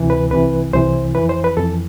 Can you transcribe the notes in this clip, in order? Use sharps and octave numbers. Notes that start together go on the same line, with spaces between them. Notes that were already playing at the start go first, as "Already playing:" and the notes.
Already playing: D2 C3 E3
B4
C2 C3 E3 B4
C2 C3 E3 C5
F2 E3 B4
C5
B4
F2 E3 A4